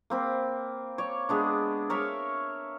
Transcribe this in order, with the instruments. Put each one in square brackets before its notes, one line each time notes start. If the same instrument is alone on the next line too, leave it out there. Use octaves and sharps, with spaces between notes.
[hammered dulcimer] A#3 C4 B5
C#5 D5
G#3 B3 D4
A#4 C#5 E5 F5